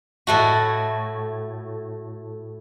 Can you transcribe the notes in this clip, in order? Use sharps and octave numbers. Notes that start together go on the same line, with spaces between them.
A2 A3 F#4